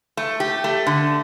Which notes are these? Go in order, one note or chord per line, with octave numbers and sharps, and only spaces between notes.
A3
G4
A3
D3